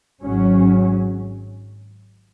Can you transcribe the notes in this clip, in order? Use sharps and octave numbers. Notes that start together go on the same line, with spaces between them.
G#1 G#2 F#3 C#4